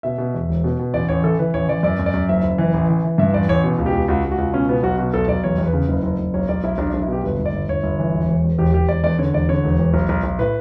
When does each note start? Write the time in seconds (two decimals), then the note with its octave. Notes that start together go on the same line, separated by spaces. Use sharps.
0.03 B2 E5
0.18 B2
0.34 E2
0.49 E1
0.64 B2
0.79 B2
0.94 A1 D5
1.09 A1 C#5
1.23 E3 A4
1.39 E3 B4
1.54 A1 C#5
1.68 E3 D5
1.83 F#2 D5
1.99 F#2
2.06 D5
2.14 F#2
2.29 F#1 E5
2.43 F#1
2.58 E3
2.74 A1
2.89 E3
3.04 E3
3.18 G2 E5
3.33 A1 D5
3.48 A1 C#5
3.64 B2
3.78 C#2
3.86 G4
3.93 C#2
4.08 C#2 F#4
4.24 C#2
4.31 F#4
4.38 C#2
4.54 B2 C#4
4.69 B2 B3
4.83 B1 F#4
4.98 B2 F#4
5.14 B1 A4
5.28 B1 D5
5.44 E2 C#5
5.58 E2
5.66 B4
5.73 C#3
5.89 F#1
6.03 F#1
6.19 F#1
6.34 B1 C#5
6.49 B1 D5
6.64 B1 E4
6.78 B1 D4
6.90 D4
6.94 B1
7.01 E4
7.08 B2 G4
7.24 G1 B4
7.39 G1
7.46 D5
7.53 G1
7.68 G1 C#5
7.83 G1
7.99 E3
8.14 E1
8.28 E1
8.44 E2
8.58 E1 G4
8.73 E1 G4
8.89 E1 D5
9.04 E2 D5
9.18 D3 C#5
9.33 E1 D5
9.49 D3 C#5
9.64 E1
9.78 E1
9.94 B1
10.09 B1
10.24 B1
10.39 A2 B4